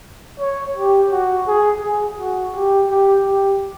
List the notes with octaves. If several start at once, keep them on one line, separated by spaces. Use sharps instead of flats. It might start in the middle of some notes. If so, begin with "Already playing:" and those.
C#5
G4
F#4
G#4
G#4
F#4
G4
G4
G4